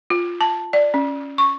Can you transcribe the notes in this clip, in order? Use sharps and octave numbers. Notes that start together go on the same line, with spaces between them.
F4
A5
D5
C#4
C#6